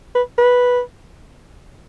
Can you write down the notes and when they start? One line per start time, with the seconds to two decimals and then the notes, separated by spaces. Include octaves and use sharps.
0.15 B4
0.38 B4